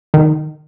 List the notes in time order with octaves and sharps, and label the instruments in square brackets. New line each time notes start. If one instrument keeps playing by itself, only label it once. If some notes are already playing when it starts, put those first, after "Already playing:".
[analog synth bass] D#3